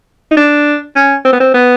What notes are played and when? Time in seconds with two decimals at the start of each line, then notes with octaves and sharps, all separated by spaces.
0.31 D#4
0.37 D4
0.96 C#4
1.25 C4
1.32 B3
1.40 C4
1.54 B3